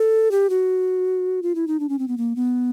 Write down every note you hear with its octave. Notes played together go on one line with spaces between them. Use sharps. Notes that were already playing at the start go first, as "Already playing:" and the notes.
Already playing: A4
G4
F#4
F4
E4
D#4
D4
C#4
C4
B3
A#3
B3